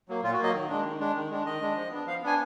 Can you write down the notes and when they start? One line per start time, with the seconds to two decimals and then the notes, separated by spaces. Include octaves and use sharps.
0.09 F#3 A#3
0.23 A#2 F4
0.33 F#4
0.39 F#3 A#3 D#5
0.54 D#3
0.69 G#3 D4
0.85 D#3
1.00 G#3 D4
1.16 D#3
1.30 G#3 D4
1.46 D#3 D#5
1.61 G#3 D4
1.76 F3
1.91 B3 D4
2.07 F3 F5
2.22 B3 D4 G#5